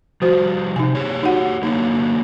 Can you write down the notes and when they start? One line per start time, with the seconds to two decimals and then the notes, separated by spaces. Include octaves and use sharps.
0.22 F3 G3 F#4 C5
0.76 C3 D#4 G#5
0.95 G4 G#4 C#5
1.23 D#4 F#4 F#5
1.63 D3 F#3 A#3 D#4